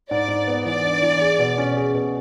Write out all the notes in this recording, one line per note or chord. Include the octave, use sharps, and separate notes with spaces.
G#2 D5
G#2
B3
E3 D5
D4
E3
G#4
B2
C#4
G#4
B2